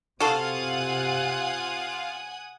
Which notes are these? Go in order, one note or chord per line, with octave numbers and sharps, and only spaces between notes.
C3 F4 F#4 A4 F5 F#5 G#5 D#6